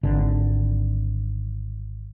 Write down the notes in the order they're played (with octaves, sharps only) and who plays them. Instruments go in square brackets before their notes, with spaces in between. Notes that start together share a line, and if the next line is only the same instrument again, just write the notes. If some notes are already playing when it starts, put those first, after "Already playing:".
[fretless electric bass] G#1 D3